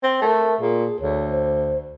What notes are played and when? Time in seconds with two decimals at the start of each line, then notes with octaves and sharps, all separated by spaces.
0.03 C4
0.22 A3 A#4
0.61 A#2 G#4
1.01 D2 C#5
1.30 C5